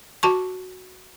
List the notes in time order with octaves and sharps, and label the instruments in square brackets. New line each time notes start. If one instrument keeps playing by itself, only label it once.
[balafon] F#4 A5 C#6